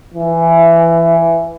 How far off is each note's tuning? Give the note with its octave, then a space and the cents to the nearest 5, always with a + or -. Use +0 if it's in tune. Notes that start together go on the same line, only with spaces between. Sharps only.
E3 +15